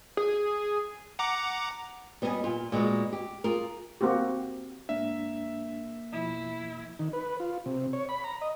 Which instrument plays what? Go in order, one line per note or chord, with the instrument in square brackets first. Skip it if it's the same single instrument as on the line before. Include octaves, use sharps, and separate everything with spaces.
[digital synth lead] G#4
[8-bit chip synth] F#5 A#5 D6
[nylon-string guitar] G3 B3 D#5 E5 G#5
A#2 F4
A#2 G#3 B3 F#4
G4
F4 G#4 A#4
[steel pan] A#3 C4 F#4 G4
[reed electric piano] G#2 D4 [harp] A#3 [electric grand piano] E5
[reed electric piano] F2 B2 F3 [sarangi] E4
[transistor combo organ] D#3
B4
F4
C3
C#5
B5
A#5
D#5